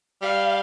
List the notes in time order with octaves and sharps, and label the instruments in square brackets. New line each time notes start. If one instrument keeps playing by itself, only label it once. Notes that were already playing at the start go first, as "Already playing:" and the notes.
[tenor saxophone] G3 [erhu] F5